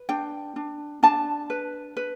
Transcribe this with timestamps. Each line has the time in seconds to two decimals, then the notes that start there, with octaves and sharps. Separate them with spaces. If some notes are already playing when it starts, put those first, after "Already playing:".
Already playing: B4
0.09 D4 G5
0.56 D4
1.03 D4 A5
1.50 B4
1.97 B4